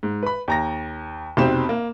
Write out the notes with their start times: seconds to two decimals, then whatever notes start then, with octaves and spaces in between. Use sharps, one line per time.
0.03 G#2
0.23 B4 B5
0.48 D#2 A#5 A#6
1.37 F1 B2 C4 D#4 G4 E7
1.69 A#3